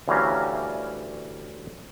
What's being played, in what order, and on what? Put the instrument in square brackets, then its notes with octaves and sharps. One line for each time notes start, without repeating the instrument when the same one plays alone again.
[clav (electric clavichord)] D2 E3 G3 C#4 F5 A#5